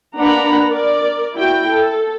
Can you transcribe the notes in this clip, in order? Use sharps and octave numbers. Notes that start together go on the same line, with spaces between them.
A#3 D4 B4 F#5 A#5 B5
A#4 D5
E4 F#4 G5
A4